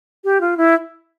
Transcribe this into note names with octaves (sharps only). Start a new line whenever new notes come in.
G4
F4
E4